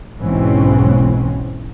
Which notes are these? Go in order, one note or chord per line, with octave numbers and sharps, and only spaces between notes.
B1 G#2 B2 E3 C4 C#4